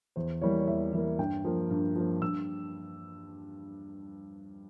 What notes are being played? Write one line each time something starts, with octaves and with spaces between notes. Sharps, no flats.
E2 C5
E3 G3 A#3 C#5
C#5
E2 E5
E3 G3 A#3
G2 G5
F3 A#3
G2
F3 A#3
G2 E6